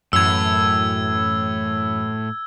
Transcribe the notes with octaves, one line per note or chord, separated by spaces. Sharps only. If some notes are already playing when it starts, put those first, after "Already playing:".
F#2 A2 E3 E6 G#6